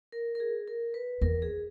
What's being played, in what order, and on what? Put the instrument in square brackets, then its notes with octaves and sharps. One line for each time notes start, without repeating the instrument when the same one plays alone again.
[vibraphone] A#4
A#4
G#4
A#4
B4
[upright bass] E2 [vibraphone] A#4
[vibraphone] G#4